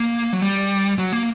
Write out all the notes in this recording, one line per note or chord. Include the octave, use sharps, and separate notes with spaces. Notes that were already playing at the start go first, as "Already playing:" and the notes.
Already playing: A#3
F#3
G3
F#3
A#3